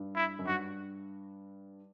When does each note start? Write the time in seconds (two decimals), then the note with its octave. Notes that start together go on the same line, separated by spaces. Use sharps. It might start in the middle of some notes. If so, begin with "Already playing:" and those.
Already playing: G2
0.16 E4
0.39 F#2
0.47 G2 F#4